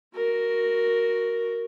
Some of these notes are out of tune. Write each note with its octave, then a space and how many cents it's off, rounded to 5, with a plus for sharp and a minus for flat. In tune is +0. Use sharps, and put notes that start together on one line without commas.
F#4 +0 A#4 +0